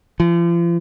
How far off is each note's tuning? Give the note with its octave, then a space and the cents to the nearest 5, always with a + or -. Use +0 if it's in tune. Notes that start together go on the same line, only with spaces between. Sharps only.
F3 -40